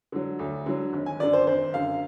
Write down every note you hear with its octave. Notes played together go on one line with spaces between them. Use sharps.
D3 F#3
D2
D3 F#3
G#1
G#5
F#2 D3 D5
C5
G#1 C5
F#2 D3 F5